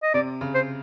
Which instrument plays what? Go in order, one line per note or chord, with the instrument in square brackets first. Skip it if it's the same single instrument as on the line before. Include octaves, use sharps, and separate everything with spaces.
[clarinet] D#5
[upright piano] C3 [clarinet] D5
[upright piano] C#3
[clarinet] C5